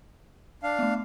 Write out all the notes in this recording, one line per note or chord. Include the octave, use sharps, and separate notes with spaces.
D4 F5
A3 B3